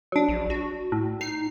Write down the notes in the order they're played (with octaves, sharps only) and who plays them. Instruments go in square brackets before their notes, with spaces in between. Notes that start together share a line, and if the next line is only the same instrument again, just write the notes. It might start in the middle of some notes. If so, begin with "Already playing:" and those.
[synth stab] F#3 D4
[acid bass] A#1
F#4
[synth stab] A2
[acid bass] D#4 [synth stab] C7